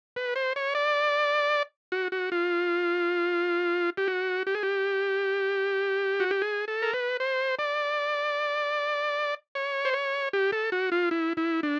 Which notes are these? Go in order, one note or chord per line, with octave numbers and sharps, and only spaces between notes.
B4
C5
C#5
D5
F#4
F#4
F4
G4
F#4
G4
G#4
G4
F#4
G4
G#4
A4
A#4
B4
C5
D5
C#5
C5
C#5
G4
A4
F#4
F4
E4
E4
D4